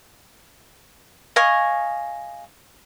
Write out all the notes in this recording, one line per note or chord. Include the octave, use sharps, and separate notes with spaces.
D#5 F5 G#5 C#6